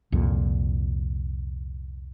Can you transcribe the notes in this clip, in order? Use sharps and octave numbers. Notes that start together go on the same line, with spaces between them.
C2 F2 A#2